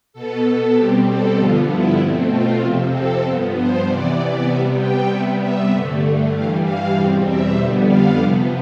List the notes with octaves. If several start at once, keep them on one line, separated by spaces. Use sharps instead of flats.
B2 B3 A4
B2 G3 C4 G4
A4
G2 D3 F3 B3 F4
E4
B2 A3 C4
F4
F2 C3 F3 C4
A4
G2 F3 B3
C5
C3 E3 B3 D5
C3 G3 B3 E5
G5
C3 G3 B3 E5
E5
G2 D3 A3
G2 E3 G3 F5
F5
E2 B2 G3 C4
E5
F2 D3 G3 B3
F5
C3 F3 B3